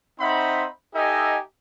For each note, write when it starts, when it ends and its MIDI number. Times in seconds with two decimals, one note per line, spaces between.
0.20 0.67 60
0.20 0.67 63
0.20 0.67 72
0.20 0.67 76
0.20 0.67 78
0.20 0.67 83
0.95 1.38 63
0.95 1.38 67
0.95 1.38 69
0.95 1.38 75
0.95 1.38 76
0.95 1.38 80